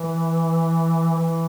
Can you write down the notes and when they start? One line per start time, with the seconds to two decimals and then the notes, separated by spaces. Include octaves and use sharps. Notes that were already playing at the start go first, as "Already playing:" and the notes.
Already playing: E3
1.16 E3